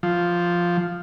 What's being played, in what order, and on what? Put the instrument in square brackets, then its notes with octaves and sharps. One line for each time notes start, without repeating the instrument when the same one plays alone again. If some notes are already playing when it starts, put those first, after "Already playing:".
[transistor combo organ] F3